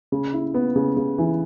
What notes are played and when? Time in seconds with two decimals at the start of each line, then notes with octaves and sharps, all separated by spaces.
0.12 C#3
0.33 E4
0.54 B3
0.76 C#3
0.97 C#3
1.18 E3